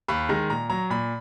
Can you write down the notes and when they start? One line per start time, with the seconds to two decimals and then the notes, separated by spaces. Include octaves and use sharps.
0.08 D#2 B5
0.29 D#3 G#3 A#5
0.50 A#2 A#5
0.70 F#3 A#5
0.90 A#2 B5